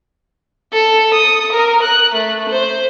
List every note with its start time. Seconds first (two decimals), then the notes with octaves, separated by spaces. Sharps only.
0.73 A4
1.13 D#6
1.52 A#4
1.82 F#6
2.14 A3
2.49 C5